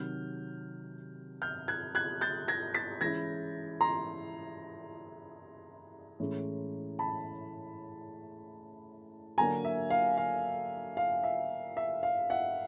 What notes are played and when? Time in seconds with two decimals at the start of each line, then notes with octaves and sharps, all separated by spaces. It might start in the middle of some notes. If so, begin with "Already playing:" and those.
Already playing: C3 D#3 F#3 F6 G6
1.42 F6 G6
1.68 F#6 G#6
1.95 F#6 G#6
2.21 G6 A6
2.48 G#6 A#6
2.74 A6 B6
3.01 E3 G#3 C#4 E4 G#6 A#6
3.81 A#5 C6
6.20 A2 E3 G#3 C#4
6.99 A5 B5
9.38 D3 F#3 A#3 D4 G#5 A#5
9.65 E5
9.90 F5
10.17 F5
10.97 F5
11.24 E5
11.77 E5
12.03 F5
12.30 E5 F#5